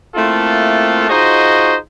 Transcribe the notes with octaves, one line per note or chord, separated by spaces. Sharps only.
A3 A#3 C4 E4 F4 A4
D#4 F4 F#4 G#4 C5 D#5